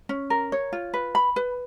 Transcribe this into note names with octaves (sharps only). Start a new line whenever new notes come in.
C#4
A#4
C#5
F4
B4
B5
B4